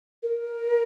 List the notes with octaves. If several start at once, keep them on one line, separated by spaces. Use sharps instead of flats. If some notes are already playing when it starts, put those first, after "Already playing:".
A#4